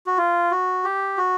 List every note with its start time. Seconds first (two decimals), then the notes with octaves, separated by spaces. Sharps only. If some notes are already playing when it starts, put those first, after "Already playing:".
0.06 F#4
0.18 F4
0.51 F#4
0.84 G4
1.18 F#4